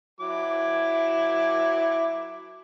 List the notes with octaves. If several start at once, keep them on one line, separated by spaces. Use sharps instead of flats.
F#3 E4 D6